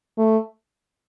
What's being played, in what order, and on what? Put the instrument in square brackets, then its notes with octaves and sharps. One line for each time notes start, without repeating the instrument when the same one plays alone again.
[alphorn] A3